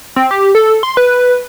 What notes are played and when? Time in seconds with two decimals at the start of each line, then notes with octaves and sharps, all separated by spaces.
0.16 C4
0.31 G4
0.55 A4
0.83 C6
0.97 B4